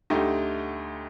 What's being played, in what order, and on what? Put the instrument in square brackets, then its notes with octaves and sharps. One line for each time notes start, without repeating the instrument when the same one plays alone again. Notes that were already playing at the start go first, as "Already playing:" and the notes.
[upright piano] D2 D3 A3 D#4 G4